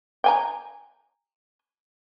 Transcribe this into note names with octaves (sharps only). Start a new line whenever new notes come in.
G5 G#5 A#5